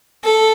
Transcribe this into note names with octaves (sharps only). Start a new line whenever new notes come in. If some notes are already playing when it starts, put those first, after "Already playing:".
A4